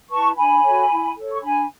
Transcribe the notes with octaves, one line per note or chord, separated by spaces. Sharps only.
E4 B4 A5 C#6
D4 G#5 B5
F#4 A4 C#5
E4
A4 C#5
C#6
D4 G#5 B5